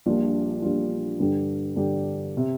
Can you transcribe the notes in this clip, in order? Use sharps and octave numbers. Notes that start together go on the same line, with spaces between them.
A#1 A#2 G3 D4 F4
A#1 A#2 G3 D4 F4
G2 D3 G3 D4 G4
G2 D3 G3 D4 G4
C3